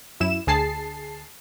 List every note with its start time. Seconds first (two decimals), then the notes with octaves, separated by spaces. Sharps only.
0.20 F#2 E4 E7
0.47 D2 G#4 A5 C7